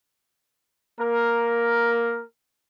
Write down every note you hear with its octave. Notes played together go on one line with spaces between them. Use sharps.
A#3 A#4